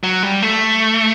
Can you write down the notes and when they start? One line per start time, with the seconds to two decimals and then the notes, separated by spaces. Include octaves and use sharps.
0.03 F#3
0.23 G3
0.42 A3